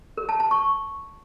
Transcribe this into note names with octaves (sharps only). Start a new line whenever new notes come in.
A#4
A5
A5
C#6